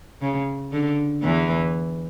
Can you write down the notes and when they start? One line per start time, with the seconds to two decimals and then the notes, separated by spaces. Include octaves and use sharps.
0.22 C#3
0.72 D3
1.23 E2 E3